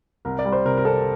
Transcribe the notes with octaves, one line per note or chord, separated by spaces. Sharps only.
C2 A#4
D5
G3
C5
C3 A#4
A#4
C4 A4